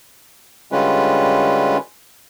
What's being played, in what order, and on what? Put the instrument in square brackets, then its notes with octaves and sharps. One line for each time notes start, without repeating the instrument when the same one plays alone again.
[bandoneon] D3 G3 G#3 C#4 F4 B4